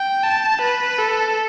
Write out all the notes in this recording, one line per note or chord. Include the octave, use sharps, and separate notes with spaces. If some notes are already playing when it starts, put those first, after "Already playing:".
Already playing: G5
A5
B4
A4